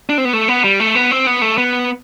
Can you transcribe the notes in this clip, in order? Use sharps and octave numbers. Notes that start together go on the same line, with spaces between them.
D4
C4
B3
A3
B3
G3
A3
B3
C4
B3
A3
B3